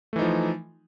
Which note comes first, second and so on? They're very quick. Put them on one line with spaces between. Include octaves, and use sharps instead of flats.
A3 E3 D#4 F3